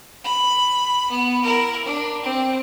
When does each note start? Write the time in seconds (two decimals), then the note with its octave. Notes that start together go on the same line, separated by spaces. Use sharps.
0.24 B5
1.10 B3
1.42 E4 A#4
1.85 D4
2.23 C4